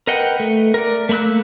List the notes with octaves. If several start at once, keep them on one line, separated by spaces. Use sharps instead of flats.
A#4 B4 D#5 F#5 G5
A3
A#4 D5
A3 A#3 B5 E6 F#6